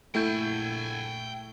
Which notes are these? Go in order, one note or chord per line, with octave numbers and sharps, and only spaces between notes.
A#1 A3 E4 G5 G#5 G6